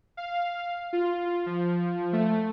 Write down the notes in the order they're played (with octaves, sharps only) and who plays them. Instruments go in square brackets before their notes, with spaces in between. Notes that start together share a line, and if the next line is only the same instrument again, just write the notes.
[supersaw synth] F5
F4
F3
A3